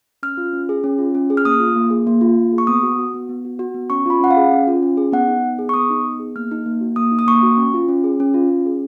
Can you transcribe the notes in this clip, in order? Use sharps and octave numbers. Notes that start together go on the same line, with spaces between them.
C#4 F6
F4
C#4
G#4
C#4
F4
C#4
G#4
F6
A#3 D#6
F4
A#3
G#4
A#3
F4
A#3
G#4
C#6
B3 D#6
F#4
F#4
B3
B3
F#4
F#4
B3
C#4 C#6
F4 B5
C#4 F#5
F5
G#4
C#4
F4
C#4
G#4
B3 F#5
D#4
B3
G#4
C#6
B3 D#6
D#4
B3
G#4
A#3 F6
D#4
A#3
F#4
A#3 D#6
D#4
D#6
A#3 C#6
F#4
C#4
F4
C#4
G#4
C#4
F4
C#4
G#4